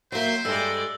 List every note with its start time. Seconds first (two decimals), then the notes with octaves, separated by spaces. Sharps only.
0.12 F#3 A#3 C5 E5 C6
0.45 G2 G#3 A4 D5 E6 G7